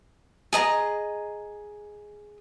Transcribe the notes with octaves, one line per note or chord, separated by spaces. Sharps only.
G#4 D#5 A#5